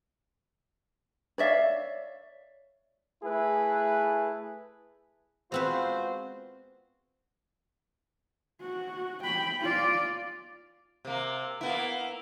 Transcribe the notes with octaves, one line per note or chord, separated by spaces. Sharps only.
C#5 D5 E5 F5
A3 E4 G#4 B4
G#3 B3 C4 F4 F#4 B4 C5
F#4
G5 B5
F4 D5
C3 A#3
A#3 B3 E4